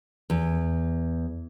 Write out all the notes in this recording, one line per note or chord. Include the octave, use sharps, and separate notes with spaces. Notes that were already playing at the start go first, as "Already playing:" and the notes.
E2